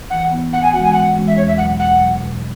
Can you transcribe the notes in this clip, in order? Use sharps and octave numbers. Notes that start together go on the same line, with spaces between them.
E3 F#5
B3 E4
G#2 F#5
G#5
E3 G#3 C#4 F#4 F#5
G#5
G#2 F#5
E3 G#3 C#4 F#4
E5
E2 C#5
E5
B2 F#3 F#5
E2 F#5
B2 F#3
B2